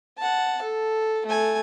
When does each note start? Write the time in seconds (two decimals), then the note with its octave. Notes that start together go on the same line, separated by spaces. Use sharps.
0.18 F#5 A5
0.62 A4
1.26 A3 G#5